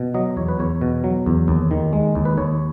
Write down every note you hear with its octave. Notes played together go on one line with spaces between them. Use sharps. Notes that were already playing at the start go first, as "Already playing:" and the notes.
Already playing: B2
F#3 D#5
E2 C#5
B4
E2 C#5
B2
F#3
E2
D#2
D#3
G#3
D#2
B4
D#2 C#5